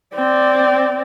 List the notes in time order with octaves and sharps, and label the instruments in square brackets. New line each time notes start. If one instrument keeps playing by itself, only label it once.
[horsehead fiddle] C4 D5